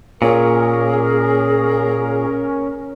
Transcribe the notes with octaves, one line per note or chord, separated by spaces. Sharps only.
A#2 C#4 G#4 A#4